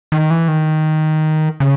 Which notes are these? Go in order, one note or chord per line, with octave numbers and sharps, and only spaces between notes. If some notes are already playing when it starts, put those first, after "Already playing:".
D#3
E3
D#3
C#3